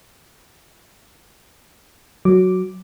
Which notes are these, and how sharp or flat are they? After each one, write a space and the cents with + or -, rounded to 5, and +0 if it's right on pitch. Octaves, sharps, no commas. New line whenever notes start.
F#3 +0 D6 +0